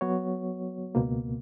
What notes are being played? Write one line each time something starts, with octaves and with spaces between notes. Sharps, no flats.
F#3 B3 F#4 C#5
C#2 B2 A#3